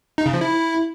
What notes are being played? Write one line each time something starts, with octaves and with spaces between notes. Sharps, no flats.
D#4
C#3
F3
E4